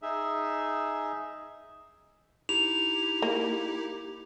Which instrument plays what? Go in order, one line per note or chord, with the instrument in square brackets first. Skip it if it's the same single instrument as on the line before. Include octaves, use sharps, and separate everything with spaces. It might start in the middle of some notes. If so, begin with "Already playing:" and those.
[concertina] D#4 G#4 E5
[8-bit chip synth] D#4 E4 G4 [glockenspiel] F7
[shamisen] A#3